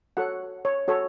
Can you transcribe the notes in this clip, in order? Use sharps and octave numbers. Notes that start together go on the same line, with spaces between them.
F#4 A4 C#5 F#5
C#5
F#4 A4 C#5